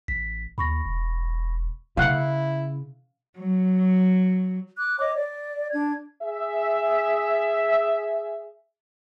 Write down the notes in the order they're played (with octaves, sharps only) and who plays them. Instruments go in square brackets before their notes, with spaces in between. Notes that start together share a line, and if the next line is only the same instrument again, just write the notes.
[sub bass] A1 [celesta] B6
[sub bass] D#2 [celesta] B5 C#6 A#6
[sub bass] E1
[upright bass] C#3 [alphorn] E4 [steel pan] F5 F#5
[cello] F#3
[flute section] D6 F#6
C#5 D#5 D6
D5
D4 G#6
[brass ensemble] G#4 E5